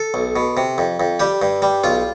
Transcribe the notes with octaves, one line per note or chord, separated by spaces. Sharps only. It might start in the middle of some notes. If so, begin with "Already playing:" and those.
Already playing: A4
B1
B2
C3
F2
F2
G3 G4
G2
G3
B1 F4